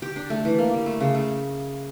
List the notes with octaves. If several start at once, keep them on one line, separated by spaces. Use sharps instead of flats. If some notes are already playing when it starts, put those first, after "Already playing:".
G4
D4
A3
E3
A#3
G3
A3
C#3
A3